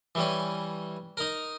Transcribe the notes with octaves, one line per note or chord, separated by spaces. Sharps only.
E3 G3 C#4
D#4 A#4